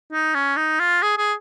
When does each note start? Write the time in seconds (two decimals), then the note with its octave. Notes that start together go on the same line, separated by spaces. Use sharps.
0.12 D#4
0.34 C#4
0.57 D#4
0.79 F4
1.02 G#4
1.17 G#4